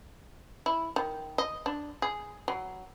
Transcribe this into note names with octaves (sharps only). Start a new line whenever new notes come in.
E4
D#3
D#5
D4
G#4
F#3